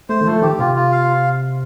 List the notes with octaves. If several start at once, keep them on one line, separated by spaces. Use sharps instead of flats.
A3 C5
D#3
F3 A3
D#3 G4
C3 F4
F4
F5